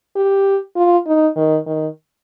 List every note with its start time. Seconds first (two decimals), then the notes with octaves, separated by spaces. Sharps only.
0.16 G4
0.76 F4
1.06 D#4
1.36 D#3
1.66 D#3